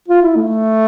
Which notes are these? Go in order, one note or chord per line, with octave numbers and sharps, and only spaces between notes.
F4
E4
A3